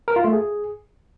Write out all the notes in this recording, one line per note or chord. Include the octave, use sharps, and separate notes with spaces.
A#4
F4
A3
G#4